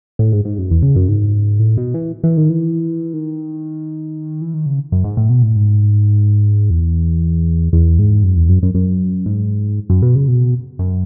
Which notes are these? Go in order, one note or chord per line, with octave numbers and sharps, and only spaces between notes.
A2
G#2
G#2
F#2
E2
C#3
F#2
G#2
A2
B2
E3
E3
D#3
E3
D#3
E3
D#3
C#3
F#2
G#2
A2
B2
A2
G#2
E2
E2
G#2
F#2
E2
F#2
F#2
F#2
G#2
F#2
B2
C#3
B2
F#2